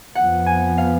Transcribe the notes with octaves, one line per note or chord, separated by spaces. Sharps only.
F2 F3 B3 F#5
G#5
F5